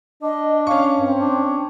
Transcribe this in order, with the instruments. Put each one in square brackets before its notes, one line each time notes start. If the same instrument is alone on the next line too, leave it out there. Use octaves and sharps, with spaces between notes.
[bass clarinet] D4 [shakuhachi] D#5
[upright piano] C#4 C#6 [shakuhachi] F5
[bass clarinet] G2 [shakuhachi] C4
[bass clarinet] D4